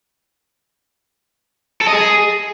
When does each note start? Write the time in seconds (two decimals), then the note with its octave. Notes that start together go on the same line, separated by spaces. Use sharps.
1.81 A4
1.87 D#5
1.93 G#4